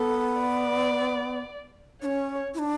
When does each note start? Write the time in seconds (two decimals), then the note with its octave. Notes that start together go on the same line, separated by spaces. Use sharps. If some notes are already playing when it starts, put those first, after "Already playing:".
Already playing: B3 A4
0.41 D5
2.02 C#4 D4 C#5
2.54 E4
2.59 D4